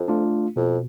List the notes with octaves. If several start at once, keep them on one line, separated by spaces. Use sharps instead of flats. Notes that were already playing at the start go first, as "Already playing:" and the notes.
Already playing: F2
A3 D4 F4
F2 B2